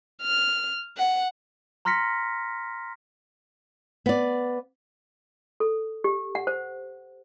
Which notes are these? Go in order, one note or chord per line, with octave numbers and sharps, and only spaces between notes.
F6
F#5
A#5 C6 F6 A#6 B6 C#7
B3 D5
A4
G4
F#5
C5